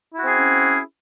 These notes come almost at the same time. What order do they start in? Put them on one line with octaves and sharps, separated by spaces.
E4 F#4 C4 G#4 C#4